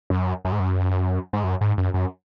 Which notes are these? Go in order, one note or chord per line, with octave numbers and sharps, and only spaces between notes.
F#2
F#2
G#2
F#2
G#2
F#2
G#2
F#2
F#2